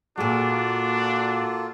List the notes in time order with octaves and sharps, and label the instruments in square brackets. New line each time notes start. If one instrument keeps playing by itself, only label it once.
[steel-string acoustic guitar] A#2 G#3 [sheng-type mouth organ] A#3 F4 A4 [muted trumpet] D4 [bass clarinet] F#4